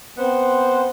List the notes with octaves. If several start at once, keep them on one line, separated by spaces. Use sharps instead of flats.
B3 C4 C5